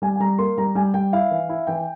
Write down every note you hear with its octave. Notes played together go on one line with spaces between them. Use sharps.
G3 G#5
G#5
G3 A#5
A#3 C6
G3 A#5
G3 G#5
G3 G5
E4 F5
E3
E4
E3 G5